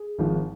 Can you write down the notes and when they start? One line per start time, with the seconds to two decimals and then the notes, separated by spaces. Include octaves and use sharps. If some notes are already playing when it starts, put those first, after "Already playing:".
Already playing: G#4
0.19 G#1 G#2 F3